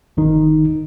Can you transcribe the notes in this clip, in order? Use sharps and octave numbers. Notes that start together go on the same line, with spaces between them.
G1 D#3 D#4